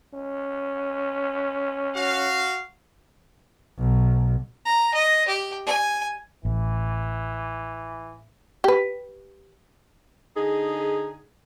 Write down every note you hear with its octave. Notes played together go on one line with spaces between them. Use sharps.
C#4
F#4 F5
B1
A#5
D#5
G4
G#5
A1 E3
G4 B4
D3 D#4 G#4